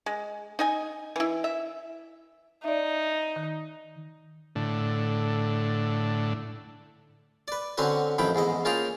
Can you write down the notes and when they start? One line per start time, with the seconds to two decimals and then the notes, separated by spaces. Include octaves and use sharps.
0.06 G#3
0.59 D#4 D#5 G#5
1.16 E3 E4
1.44 E5
2.64 D#4 D5 E5
3.36 D#3
4.56 A2 D3
7.48 B4 D5
7.78 D3 C4 C#4 F#4 B4
8.18 A1 F2 D#3 E4 G5 B5
8.35 E2 G#2 E4 D#5
8.65 A#3 C#4 F4 G#4 G5 A#5